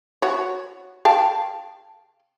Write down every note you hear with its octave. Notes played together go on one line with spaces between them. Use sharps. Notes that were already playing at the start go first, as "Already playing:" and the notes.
F#4 C#5
F5 G5 A5